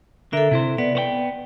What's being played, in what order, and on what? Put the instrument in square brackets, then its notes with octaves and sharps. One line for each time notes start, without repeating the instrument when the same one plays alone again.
[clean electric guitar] D3 A#4 [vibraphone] A4 E5
[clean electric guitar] C3 E4 C5
[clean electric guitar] B3 [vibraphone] D5
[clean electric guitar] B3 C5 G5